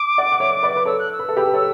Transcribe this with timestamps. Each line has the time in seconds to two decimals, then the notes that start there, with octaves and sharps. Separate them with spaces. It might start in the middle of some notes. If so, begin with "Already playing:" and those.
Already playing: D6
0.18 D5 F#5
0.32 F#5
0.40 C#5 E5
0.63 B4 D5
0.76 B4
0.85 A4 C#5 E6
0.99 F#6
1.12 E6
1.19 B4
1.29 A4
1.37 G4 B4
1.54 A4 C#5